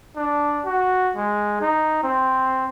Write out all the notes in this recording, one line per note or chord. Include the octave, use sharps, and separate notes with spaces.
D4
F#4
G#3
D#4
C4